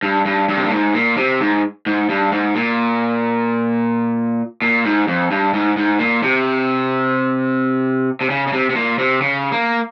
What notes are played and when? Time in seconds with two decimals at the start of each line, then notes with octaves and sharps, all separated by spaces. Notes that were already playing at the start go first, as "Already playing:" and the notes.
0.03 G2
0.25 G2
0.49 G2
0.57 C3
0.64 A#2
0.72 G#2
0.94 A#2
1.17 C3
1.40 G#2
1.86 G#2
2.09 G2
2.32 G#2
2.55 A#2
4.62 A#2
4.85 G#2
5.08 F2
5.31 G2
5.53 G#2
5.77 G#2
5.99 A#2
6.23 C3
8.21 C3
8.30 C#3
8.47 C#3
8.53 C3
8.70 C3
8.75 A#2
8.98 C3
9.21 C#3
9.52 A#3